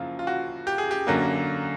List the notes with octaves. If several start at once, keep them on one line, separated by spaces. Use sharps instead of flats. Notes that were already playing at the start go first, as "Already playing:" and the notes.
Already playing: F#2 C#3 F3 A#3 E4 F4
F4
F#4
G4
G#4
G4
F#2 D3 F#3 A#3